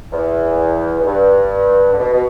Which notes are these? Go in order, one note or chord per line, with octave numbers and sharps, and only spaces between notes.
E2
E2
G2
D3
B2
B2